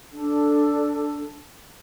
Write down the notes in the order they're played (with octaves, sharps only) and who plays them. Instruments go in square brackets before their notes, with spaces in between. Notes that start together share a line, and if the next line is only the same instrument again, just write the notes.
[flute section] D4 A4